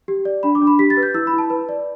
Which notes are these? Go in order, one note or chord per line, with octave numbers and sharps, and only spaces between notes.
G4
D5
D4 B5
D6
D4
B5
G4 B6
A6
B4
G6
E4 E6
B5
E4
A5
B4
D5